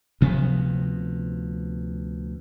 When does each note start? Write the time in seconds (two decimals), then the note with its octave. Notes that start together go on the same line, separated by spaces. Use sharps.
0.21 D2 C3 F3 B3